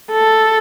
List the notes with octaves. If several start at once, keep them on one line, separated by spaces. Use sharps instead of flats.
A4